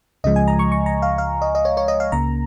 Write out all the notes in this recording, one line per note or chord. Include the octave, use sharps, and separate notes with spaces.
C#2 C#3 F3 G#3 D#5
G#5
A#5
C#6
C#6
A#5
F5
F5
D#5
D#5
C#5
C#5
D#5
F5
C#2 C#3 A#3 A#5